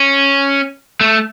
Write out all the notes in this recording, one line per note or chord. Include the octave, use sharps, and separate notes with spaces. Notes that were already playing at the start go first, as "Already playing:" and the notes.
Already playing: C#4
A3